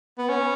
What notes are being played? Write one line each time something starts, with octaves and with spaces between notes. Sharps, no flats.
B3
C#4